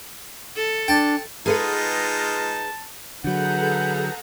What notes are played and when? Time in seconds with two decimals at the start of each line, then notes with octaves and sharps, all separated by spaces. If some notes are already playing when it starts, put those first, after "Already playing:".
0.56 A4
0.88 D4 G5 A5
1.46 G#3 D#4 F4 G#4 B4 F#5 A5
3.24 D3 F#3 G#4 A4 B4 F#5 A#5 G6